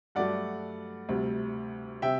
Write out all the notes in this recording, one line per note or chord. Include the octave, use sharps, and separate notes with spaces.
G2 F#3 A3 D5 F#5
D2 C3 G3
C3 E5 G5